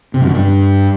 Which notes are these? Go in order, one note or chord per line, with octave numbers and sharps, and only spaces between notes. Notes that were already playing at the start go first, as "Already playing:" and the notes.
C3
F#2
D3
G2